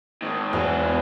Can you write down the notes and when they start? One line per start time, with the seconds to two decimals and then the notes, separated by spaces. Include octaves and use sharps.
0.22 G#2 D#3
0.53 E2 G#3 F#4